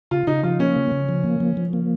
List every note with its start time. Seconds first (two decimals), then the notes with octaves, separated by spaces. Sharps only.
0.11 C#3 F4
0.27 C#3 D#4
0.43 F3 F4
0.60 A#3 C#4
0.76 C#3
0.92 C#3
1.09 F3
1.24 A#3
1.40 F3
1.57 F3
1.73 A#3